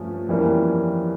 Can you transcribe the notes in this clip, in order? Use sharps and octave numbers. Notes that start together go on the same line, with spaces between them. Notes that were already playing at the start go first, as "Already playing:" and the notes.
Already playing: G2 F3 A3 C#4
F2 E3 G3 A#3 C#4